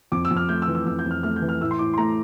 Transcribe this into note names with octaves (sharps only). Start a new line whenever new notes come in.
F2 D6
E6
F2
F6
A3 G6
E6
E3
E6
F2 E6
G6
F2 F6
A3 F6
G6
E3
F6
A2 E6
C6
A2 D6
C6
A3 A#5